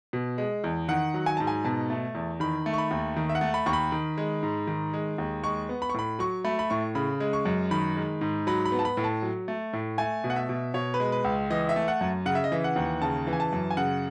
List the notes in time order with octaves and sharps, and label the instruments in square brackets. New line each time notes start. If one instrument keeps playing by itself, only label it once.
[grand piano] B2
G#3
E2
D#3 F#5
F#3
G#5
G#2 A5
G#5
B2 A5
A3
E2
D#3 B5
A3
C#6
B5
D#2
D#3
E5
F#5
A3
B5
D#2 C#6
B5
D#3
G#3
G#2
D#3
G#3
D#2
G#3 C#6
B3
B5
C#6
A2 B5
F#3 C#6
A3 B5
B5
A2 C#6
C#3 B5
G#3
C#6
F#2
D#3 B5
G#3
G#2
F#3 B5
B5
B3
A5
B5
A2
A5
F#3
A3
A2
A3 G#5
B2
F#5
E5
B2
B2 C#5
B4
G#3
B4
C#2
E3 D#5
E5
A3
F#5
F#2
C#3 F#5
E5
D#5
E3 E5
F#5
D#2
C#3 A5
E3
G#5
A5
F#2
G#5
C#3 F#5